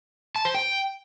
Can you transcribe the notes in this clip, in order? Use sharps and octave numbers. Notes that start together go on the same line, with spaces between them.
A5
C5
G5